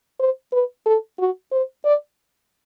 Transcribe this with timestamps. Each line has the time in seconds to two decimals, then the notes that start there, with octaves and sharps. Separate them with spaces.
0.20 C5
0.52 B4
0.86 A4
1.19 F#4
1.52 C5
1.85 D5